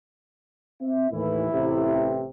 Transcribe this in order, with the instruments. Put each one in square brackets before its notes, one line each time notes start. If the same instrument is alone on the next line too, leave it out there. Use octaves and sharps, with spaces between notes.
[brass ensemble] C4 E5
[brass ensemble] D#2 A2 E3 [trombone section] E4
[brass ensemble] A1 C3